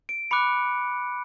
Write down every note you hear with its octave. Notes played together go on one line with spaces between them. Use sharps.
D7
B5 D6 F#6 C#7